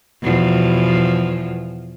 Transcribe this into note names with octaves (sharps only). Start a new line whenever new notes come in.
E2 B2 F3